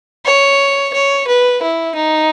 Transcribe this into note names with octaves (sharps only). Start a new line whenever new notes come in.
C#5
C#5
B4
E4
D#4